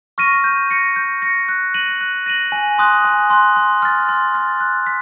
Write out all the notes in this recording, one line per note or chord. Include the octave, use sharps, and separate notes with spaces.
C#6 F6 A#6 D#7
G6
A#6 C#7
G6
A#6 C#7
F#6
A#6 D#7 F#7
F#6
A#6 D#7 F#7
G#5
C6 D#6 F#6
G#5
C6 D#6 F#6
C6
F6 A6
C6
F6 A6
F#6
B6